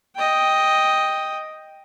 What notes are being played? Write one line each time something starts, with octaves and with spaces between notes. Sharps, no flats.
D#5 G5